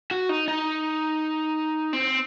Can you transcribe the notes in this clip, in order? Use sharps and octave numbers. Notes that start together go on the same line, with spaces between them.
F#4
D#4
D#4
C4